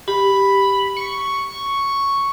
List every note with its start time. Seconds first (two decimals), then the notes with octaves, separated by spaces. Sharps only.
0.08 G4 B5
0.97 C#6